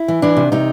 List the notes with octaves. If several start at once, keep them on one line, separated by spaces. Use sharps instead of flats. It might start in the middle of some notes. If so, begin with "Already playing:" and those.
Already playing: E4
E3
E3 D4
C3
C3 D#4